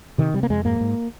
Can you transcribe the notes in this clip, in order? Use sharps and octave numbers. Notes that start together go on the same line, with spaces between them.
C3 D#3
C3 G3
A#3
F2 G#3
G#2 A#3
G#2